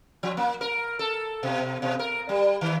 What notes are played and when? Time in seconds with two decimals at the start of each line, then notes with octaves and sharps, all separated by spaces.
0.23 F3
0.37 A#3
0.61 A#4
0.99 A4
1.43 B2
1.82 B2
1.99 A#4
2.29 G3
2.61 D#3